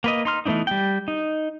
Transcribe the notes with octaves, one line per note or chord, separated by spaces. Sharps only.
A#3 B4 D#5
D#4 C6 F6
E3 A3 B3 D4 D#4
G3 G5
D#4